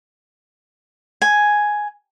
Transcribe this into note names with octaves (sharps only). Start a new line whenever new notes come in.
G#5